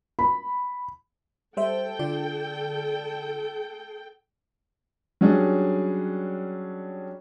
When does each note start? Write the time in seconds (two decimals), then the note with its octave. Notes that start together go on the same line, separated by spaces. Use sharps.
0.19 B5
1.57 G3 A4 C5 E5 G5
1.99 D3 F4 D5
5.21 F#3 G3 C#4 D4 G#4